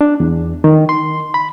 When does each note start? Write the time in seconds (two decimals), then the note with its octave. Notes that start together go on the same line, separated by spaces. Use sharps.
0.01 D4
0.20 E2
0.64 D#3
0.89 C6
1.34 B5